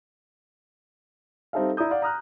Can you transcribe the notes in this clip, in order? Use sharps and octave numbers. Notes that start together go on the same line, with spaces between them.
G3 C4 D#4 A4 E5 F5
E4 D5 A#5 D#6 G6
D5 F5 F#5
A#5 D#6 F6 F#6